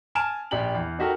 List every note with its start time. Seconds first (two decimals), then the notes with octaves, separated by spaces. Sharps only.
0.15 G#5 A5 F6 D7 E7
0.51 A#1 G4 D5 G5 F#7
0.74 E2
0.99 D#4 F#4 G4 A4 A#4